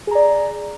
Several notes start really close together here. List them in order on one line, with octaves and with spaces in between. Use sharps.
G#4 A#5 D5